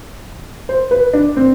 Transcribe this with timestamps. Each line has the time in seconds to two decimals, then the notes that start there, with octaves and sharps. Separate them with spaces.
0.69 C5
0.91 B4
1.13 D4
1.36 C4